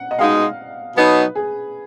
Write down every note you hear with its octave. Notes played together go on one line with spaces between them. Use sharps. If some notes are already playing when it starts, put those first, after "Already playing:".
Already playing: F#5
D#5
B2 G#3 D#4 F5
B2 F#3 B3 D#4 B4
G#4